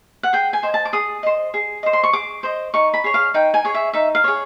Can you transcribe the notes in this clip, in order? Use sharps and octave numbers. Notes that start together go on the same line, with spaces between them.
F#5
G#4 G5
G#5
C5 D#5
A5
D6
G#4 D#6
C5 D#5
G#4
C5 D#5
C6
C#6
G#4 D6
C5 D#5
D#4 C#6
B5
G#4 C#5
F5
D#4 G5
G#5
G#4 C#5
E5
D#4 E5
F5
G#4 C#5